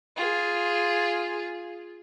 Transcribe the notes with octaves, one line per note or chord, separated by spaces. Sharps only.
F4 G#4